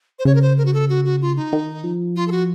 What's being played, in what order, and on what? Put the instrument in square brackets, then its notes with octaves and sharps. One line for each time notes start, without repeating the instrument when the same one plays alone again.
[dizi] C5
[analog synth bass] C#3 [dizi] C#5
[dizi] A#4
C5
A#4
F#4
A4
F#4
F#4
F4
D#4
[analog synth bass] D#3
F3
[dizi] F4
A4
F#4